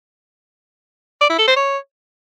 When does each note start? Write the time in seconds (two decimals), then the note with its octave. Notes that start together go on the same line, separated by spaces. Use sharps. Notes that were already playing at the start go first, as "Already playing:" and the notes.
1.21 D5
1.30 E4
1.39 A4
1.48 C5
1.56 C#5